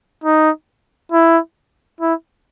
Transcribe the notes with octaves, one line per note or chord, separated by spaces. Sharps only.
D#4
E4
E4